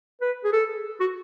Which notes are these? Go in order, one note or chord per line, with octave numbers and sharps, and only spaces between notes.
B4
G#4
A4
F#4